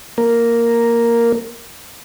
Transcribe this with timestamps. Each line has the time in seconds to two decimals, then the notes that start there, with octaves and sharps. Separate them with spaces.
0.18 A#3 A#4